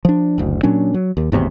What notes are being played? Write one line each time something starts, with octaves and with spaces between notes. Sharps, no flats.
F3 D4
F#1 D2
A#2 F#3 C#4 D4
F#3
D#2
G#1 E2 A2 C3